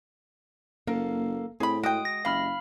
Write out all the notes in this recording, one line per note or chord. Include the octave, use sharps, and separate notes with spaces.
F#1 A#3 A4 A#4 F5
A2 C4 G#4 B5
G#3 F#4 G5 D#6 D7
A#6
F#1 C3 F5 B5 F6